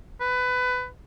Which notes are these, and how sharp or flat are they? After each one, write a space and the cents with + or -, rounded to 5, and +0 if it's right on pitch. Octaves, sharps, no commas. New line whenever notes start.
B4 +20